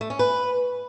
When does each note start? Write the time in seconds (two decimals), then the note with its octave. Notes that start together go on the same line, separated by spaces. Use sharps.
0.01 A3
0.10 C#4
0.19 B4